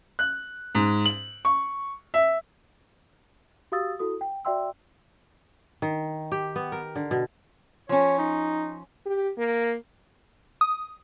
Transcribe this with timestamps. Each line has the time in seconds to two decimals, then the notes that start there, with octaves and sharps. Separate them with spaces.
0.19 F#6
0.75 G#2
1.06 F#7
1.45 C#6
2.14 E5
3.72 F#4 G4 F5 D#6 E6 A6
3.99 E4 F#4 A4 D#6
4.21 G5
4.45 F#4 D5 E5 G5 C6 E6
5.82 D#3
6.32 G4
6.56 B3
6.72 A#4
6.96 D3
7.11 B2
7.89 F3 C#4 C#5
8.19 D#4
9.06 G4
9.38 A#3
10.61 D#6